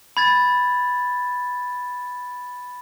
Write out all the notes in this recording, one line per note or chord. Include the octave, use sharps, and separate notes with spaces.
B5 G#6 A6